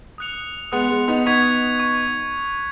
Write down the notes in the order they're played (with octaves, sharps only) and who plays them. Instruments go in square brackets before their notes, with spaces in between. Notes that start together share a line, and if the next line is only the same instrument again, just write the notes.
[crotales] D#6 F#6 C#7 F7
[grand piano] G#3 B3 [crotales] D#6 F#6 C#7 F7
[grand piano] G#3 B3
B3 D#4
[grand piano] B3 D#4 [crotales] C#6 G#6 B6 F7
[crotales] C#6